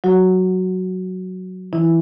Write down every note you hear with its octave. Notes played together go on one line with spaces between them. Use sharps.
F#3 F#4
E3 E4